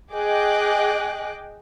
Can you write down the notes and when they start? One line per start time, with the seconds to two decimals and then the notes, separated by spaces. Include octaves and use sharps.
0.13 G#4 D#5 G5 D6 F#6